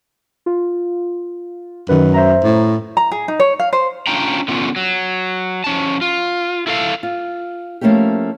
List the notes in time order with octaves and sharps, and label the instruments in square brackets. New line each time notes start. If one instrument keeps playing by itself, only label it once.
[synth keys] F4
[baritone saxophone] F#2 [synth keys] D#3 B4
[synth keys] C5 E5 A#5
[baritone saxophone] A2
[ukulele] A#5
G#4
D#4
C#5
F5
C5
[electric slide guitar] C#4 D4 F4 G5 A#5
D3 B3 C#4 F4
F#3
F3 C#4 A5
F4
E4 A4 F5
[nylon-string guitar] F4
F3 A3 A#3 C#4 E4 G4